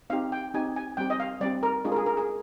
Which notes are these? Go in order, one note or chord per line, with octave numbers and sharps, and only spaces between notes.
C4 D#4 G4 F5
G5
C4 D#4 G4 G#5
G#5
G3 C4 G4 G5
D#5
F5
G3 C4 G4 D5
A#4
G#3 D4 F4 G#4
A#4
G#4
A#4
G#4